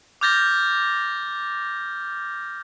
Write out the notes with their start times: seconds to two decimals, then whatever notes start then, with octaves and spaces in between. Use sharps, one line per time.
0.21 D6 F6 G6 A6 A#6 G7